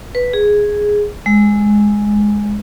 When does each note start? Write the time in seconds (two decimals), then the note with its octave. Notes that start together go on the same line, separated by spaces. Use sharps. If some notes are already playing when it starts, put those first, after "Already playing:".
0.15 B4
0.33 G#4
1.26 G#3